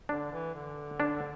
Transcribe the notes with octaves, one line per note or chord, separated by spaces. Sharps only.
D3 D4
E3
D3
D4